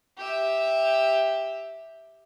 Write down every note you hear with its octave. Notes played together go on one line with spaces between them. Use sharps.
G4 E5